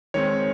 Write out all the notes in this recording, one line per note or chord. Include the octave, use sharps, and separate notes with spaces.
D#3 G#3 C4 C#5